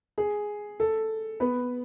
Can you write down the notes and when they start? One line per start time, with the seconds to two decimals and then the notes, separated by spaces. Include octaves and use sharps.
0.18 G#4
0.80 A4
1.40 B3 B4